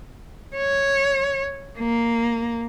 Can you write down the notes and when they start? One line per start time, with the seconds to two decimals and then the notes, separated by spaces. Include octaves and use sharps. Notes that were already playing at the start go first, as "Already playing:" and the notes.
0.57 C#5
1.79 A#3